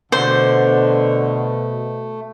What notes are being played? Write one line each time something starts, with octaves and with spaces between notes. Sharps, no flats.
B2 D3 A3 C5